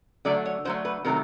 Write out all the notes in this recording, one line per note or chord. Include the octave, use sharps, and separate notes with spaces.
D3 F#3 A3 D5
C#5
D3 F#3 A3 C5
B4
C3 D#3 F#3 A3 A#4